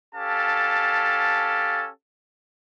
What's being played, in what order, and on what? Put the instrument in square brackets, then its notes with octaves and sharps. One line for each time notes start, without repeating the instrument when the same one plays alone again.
[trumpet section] C#4 G4 A4 F5 A5